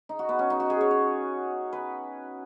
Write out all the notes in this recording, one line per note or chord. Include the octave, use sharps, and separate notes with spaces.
D#4
F#4
B3
C#4
D#4
F#4
G#4
C#5
C#5
B4